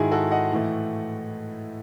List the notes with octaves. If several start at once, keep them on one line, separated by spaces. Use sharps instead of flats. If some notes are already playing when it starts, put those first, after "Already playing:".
Already playing: G#2 D#3 G#3 D#4 E4 F#4 G#4
F#4 A4
D#5 F#5
A2 E3 A3